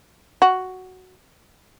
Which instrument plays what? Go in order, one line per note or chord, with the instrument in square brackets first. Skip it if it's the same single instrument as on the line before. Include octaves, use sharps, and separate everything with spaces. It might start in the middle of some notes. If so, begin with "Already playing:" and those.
[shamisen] F#4